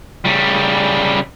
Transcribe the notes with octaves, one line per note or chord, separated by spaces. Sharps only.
C#3 G3